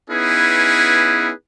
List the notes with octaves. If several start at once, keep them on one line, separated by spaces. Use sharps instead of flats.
B3 C#4 D#4 E4 G#4 B4